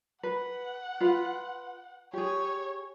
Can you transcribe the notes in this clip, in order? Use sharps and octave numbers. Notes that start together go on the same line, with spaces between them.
B4 F#5
F4 B4
G4 G#4 C#5